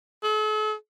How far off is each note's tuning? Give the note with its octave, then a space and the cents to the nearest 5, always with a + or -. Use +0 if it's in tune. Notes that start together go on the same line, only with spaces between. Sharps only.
A4 -45